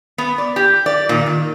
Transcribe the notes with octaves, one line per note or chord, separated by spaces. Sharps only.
B3
D5
G4
D5
A#2 D#3
D#3